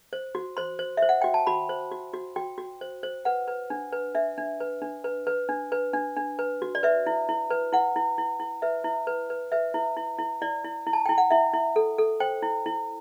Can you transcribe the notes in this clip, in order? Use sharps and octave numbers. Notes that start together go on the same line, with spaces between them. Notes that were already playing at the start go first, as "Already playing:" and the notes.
C5
F#4
C5 C6
C5
E5
C5
F#5
F#4 G5
A5
F#4 B5
C5
F#4
F#4
F#4 G5
F#4
C5
C5
B4 F#5
B4
D4
B4
D4 E5
D4
B4
D4
B4
B4
D4
B4
D4
D4
B4
F#4
D5
B4 E5
E4
E4
B4
E4 F#5
E4
E4
E4
B4 E5
E4
B4
B4
B4 E5
E4
E4
E4
E4 D5
E4
E4
A5
E4 G5
F#5
E4 E5
E4
A4
A4
C5 G5
E4
E4